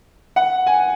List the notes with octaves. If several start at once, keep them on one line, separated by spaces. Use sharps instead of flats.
F#5
G#5